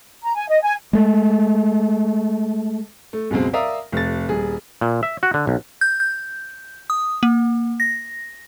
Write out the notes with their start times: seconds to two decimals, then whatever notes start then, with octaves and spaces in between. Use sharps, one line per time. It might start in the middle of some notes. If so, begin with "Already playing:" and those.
0.24 A#5
0.35 G#5
0.49 D#5
0.63 G#5
0.93 G#3 A3
3.13 A3
3.31 C#2 F#2 B2 G#3 C4
3.53 A#4 D5 E5 F5 A#5 D#6
3.92 F1 A6
4.28 D#1 G#4
4.81 A#2
5.03 E5
5.23 F#4
5.34 D3
5.47 B1
5.81 G6
6.00 G6
6.90 D#6
7.23 A#3
7.80 A#6